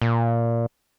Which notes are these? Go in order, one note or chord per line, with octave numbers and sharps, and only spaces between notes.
A#2